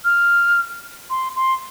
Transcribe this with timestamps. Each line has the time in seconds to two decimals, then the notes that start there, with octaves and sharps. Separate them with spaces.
0.05 F6
1.10 C6
1.36 C6